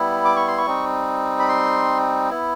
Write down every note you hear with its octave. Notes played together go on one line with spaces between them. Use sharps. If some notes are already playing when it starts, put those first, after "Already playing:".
Already playing: G3 B3 E4
D6
C#6
C6
C#6
G3 C4 D#4
B5
C6
B3 E4